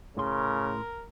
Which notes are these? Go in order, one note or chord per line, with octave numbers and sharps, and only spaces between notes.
A2 C#3 A#4 C6